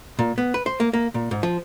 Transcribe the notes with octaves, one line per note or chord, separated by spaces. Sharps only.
A#2
B3
B4
C5
A#3
A#3
A#2
G#2
F3